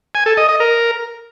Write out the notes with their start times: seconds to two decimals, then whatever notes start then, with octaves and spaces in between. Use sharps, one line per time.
0.15 G#5
0.26 A4
0.37 D#5
0.49 D#5
0.60 A#4